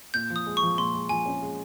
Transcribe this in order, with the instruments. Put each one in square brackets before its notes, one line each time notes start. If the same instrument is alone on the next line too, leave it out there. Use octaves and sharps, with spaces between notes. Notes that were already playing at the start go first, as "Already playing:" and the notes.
[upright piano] A#2 [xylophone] G6
[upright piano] F3
[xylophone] D#6
[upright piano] G#3
[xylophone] C#6
[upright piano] F3
[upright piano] A#2 [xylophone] C6
[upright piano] G#3
[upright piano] F3 [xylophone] G#5
[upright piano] C#4
G#3